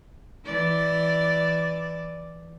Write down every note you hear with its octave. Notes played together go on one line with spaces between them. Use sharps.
E3 D5